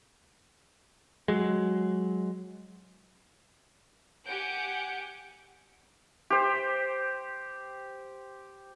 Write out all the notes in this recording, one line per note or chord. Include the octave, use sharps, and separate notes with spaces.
F#3 G#3
G4 F#5 G#5 G6 C#7 D7
G4 C5